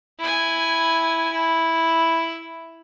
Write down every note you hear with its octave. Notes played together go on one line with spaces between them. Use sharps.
E4 G#5
E4